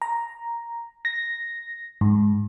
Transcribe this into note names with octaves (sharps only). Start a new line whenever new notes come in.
A#5
A#6
G#2